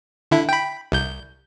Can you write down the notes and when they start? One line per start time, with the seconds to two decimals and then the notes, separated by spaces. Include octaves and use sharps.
0.31 D3 E4
0.49 G5 B5
0.92 C2 G6